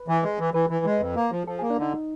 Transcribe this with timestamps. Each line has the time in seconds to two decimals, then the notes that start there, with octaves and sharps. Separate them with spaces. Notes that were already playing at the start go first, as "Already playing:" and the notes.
Already playing: B4
0.08 E3
0.23 G#3
0.39 E3
0.54 E3 B4
0.70 E3
0.85 G#3
1.00 F2
1.16 A#3
1.32 F3
1.47 F3 A4
1.59 G#4
1.62 A#3
1.70 D4
1.78 D3 D#4